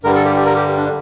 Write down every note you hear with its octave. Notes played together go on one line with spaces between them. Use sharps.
G2 D3 G3 A#4
A4
G4
G4
A#4
G4
D4